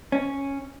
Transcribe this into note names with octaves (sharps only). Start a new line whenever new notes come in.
C#4